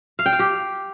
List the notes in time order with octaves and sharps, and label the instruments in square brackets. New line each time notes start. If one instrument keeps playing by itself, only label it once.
[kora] F5
G5
F5
G4